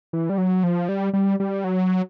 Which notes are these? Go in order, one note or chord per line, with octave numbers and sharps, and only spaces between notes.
E3
G3
F#3
F3
G3
G3
G3
F#3